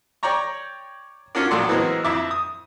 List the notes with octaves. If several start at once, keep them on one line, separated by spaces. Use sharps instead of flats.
C#5 D5 G5 A#5 C#6
C#4 D4 F4 F#4 A#4 D5
A#1 A2 F#3 A4 D5 C6
E3 F#3 G#3 A#3 C4
F2 E4 E5 D6
D#6